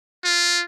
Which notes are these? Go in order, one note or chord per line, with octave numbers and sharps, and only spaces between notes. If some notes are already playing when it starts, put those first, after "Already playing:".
F4